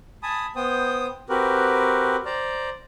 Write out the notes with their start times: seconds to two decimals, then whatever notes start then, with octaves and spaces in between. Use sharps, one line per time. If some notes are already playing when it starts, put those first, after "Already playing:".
0.23 G#5 A5 B5 D#6
0.56 B3 C5 G5 D#6
1.29 C4 F#4 G4 A#4 B4
2.26 C5 D5 A#5